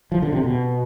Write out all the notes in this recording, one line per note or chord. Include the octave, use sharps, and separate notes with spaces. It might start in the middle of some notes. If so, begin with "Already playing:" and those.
F3
D3
C3
B2